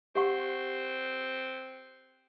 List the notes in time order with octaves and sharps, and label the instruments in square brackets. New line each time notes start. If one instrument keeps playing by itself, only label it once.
[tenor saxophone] C4 [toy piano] G4 F#5 C#6